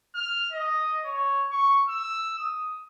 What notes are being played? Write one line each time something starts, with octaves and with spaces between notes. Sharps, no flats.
F6
D#5
C#5
C#6
E6
D#6